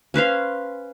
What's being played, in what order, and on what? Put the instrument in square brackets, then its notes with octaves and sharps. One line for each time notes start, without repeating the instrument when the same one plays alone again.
[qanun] C#4 B4 C5 F5